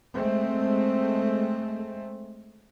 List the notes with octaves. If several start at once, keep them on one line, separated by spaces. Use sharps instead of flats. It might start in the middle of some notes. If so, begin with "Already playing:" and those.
G#3 A3 C4